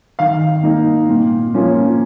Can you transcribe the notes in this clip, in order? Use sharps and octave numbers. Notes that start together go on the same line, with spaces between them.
D#3 F5
A#3 D#4
A#2
F3 A#3 C#4 F4